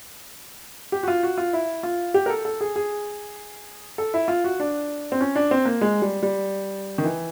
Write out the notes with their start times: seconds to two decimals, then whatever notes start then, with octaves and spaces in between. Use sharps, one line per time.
0.92 G4
1.03 F#4
1.08 F4
1.23 F#4
1.38 F4
1.53 E4
1.83 F4
2.14 G4
2.26 A#4
2.30 A4
2.45 A4
2.61 G#4
2.76 G#4
3.98 A4
4.14 E4
4.28 F4
4.44 F#4
4.60 D4
5.12 C4
5.21 C#4
5.35 D4
5.51 C4
5.65 A#3
5.81 G#3
6.02 G3
6.23 G3
6.98 D#3
7.04 E3